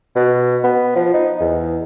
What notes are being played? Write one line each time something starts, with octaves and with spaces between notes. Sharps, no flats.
B2
B3
F3
D#4
E2